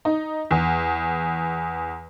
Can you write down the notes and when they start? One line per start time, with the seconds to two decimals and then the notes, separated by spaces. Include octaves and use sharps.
0.05 D#4
0.51 E2